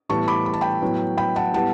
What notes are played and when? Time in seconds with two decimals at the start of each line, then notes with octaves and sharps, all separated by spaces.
0.09 A2 E3 G3 B3 A5 C#6
0.28 B5 D6
0.46 B5
0.54 A5
0.61 G5 B5
0.82 A2 F#3 B3
1.18 G5 B5
1.36 F#5 A5
1.53 A2 G3 B3 F#5 A5